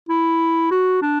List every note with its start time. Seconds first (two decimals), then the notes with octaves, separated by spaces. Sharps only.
0.09 E4
0.71 F#4
1.02 D4